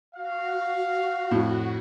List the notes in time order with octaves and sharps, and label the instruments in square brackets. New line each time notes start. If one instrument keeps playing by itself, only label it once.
[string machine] F#4 [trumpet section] F5
[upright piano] F2 A2